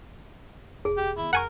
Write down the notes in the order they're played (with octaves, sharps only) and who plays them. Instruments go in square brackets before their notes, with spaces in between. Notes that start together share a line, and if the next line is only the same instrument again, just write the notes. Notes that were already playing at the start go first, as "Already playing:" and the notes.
[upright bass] E1 [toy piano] G#4
[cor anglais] G4
[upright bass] D#3 B3 [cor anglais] E4
[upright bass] F2 [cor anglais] A#4 [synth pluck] F#5 G#5 C#6